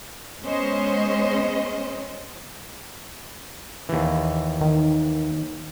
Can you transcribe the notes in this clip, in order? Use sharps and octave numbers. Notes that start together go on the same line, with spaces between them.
G#3 B3 C#4 C5 D#5
D#2 E3
D#3